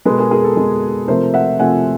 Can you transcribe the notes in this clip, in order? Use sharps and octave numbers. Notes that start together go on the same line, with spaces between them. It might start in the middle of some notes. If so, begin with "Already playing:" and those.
B2 G#3 A4 B4
G#4 A#4
G#4 A#4
A4
B2 G#3
C3 F3 A3 A#4 C5
E5 F#5
C3 F3 A3 F#5 G#5